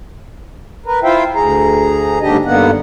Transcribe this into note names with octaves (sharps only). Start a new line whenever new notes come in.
A#4 B4
E4 F4 C5 E5 F5 G5
D2 G#4 A#5
D#2 G#2 D3 D4 G4 D#5
G2 D3 D#3 A#3 B3 F#5